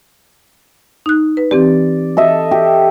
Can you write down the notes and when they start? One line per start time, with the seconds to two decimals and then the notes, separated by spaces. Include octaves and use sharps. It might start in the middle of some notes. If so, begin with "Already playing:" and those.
1.06 D#4 F#6
1.37 B4
1.51 E3 C4 G4 D5
2.17 A4 D#5 E5
2.51 G4